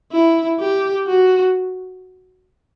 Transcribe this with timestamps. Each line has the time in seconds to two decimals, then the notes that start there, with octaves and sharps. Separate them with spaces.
0.12 E4
0.60 G4
1.07 F#4